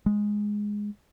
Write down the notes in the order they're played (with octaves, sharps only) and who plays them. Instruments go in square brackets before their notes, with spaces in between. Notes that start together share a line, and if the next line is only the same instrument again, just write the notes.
[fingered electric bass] G#3